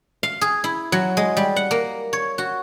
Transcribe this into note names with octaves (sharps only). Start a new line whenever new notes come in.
F5
G#4
E4
F#3
G#3
G3
F#5
A#3
C#5
F#4